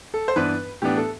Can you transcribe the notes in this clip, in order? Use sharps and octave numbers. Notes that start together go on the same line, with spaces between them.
A4
C5
G2 E3 B3 D4 B4
A2 E3 B3 D4 G4
A4